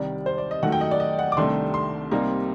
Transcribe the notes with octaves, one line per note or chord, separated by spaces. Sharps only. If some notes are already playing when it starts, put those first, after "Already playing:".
Already playing: C2 C3 D#3 G3 D5
C5
D5
D#5
F#2 D#3 F#3 A3 D#4 F#5
G5
D#5
D5
D#5
F#5
D6
C2 C3 D#3 A3 D4 C6
C6
C2 C3 G3 A#3 D#4